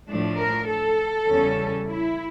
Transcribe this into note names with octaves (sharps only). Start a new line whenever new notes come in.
A2 F3 A3 D4
A#4
A4
E2 C#3 G3 C#4
E4